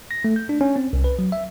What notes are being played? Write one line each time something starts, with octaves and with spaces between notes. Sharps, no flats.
A#6
A3
G6
D4
C#4
C4
C2
B4
F#3
E5